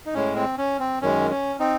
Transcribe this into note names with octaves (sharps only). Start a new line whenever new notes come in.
D#4
A2 G#3 C#4
C4
C#4
C4
F#2 D#3 G#3 C#4
C#4
C4 D#4